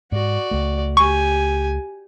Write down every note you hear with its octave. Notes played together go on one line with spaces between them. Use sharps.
G#2 F#4 D5
C#2 A3
G4 G#5 C#6